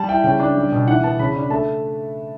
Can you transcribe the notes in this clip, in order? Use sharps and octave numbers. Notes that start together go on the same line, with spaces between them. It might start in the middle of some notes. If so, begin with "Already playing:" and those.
Already playing: G3 A5
E4 G5
C#3 G5
D4
G3
B2
E3 F#5
B3 A5
C#3 B5
D4
A3 A5